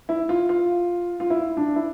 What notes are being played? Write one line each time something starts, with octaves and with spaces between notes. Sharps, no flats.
E4
F4
F4
F4
E4
D4
E4